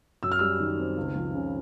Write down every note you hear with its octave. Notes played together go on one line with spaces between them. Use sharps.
F#2 E6
F6
G3 E6
D#3
C4
C#2
F3
C#3